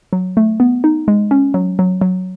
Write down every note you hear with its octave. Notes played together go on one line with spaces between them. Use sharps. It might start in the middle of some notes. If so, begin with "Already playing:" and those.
F#3
A3
B3
D#4
G#3
C#4
F#3
F#3
F#3